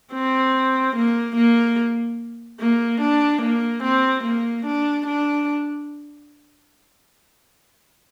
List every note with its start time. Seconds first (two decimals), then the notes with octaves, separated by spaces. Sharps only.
0.13 C4
0.96 A#3
1.36 A#3
2.60 A#3
3.01 D4
3.42 A#3
3.83 C4
4.24 A#3
4.65 D4
5.07 D4